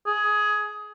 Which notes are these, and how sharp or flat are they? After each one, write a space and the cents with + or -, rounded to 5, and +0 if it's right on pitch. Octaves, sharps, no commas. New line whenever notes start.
G#4 +15